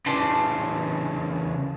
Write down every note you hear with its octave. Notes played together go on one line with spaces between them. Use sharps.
C#3 E3 D4 C6